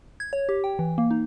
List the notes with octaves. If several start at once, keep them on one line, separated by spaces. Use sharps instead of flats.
G#6
C#5
G4
G5
E3
A#3
D#4